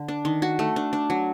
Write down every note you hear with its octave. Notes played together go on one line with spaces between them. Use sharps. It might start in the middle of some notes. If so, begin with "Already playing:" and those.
Already playing: D3
D4
D#3
F#4
A3
D4
D4
F#3